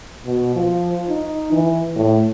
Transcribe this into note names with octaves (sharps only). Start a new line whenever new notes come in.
B2
F3
D#4
E3
A2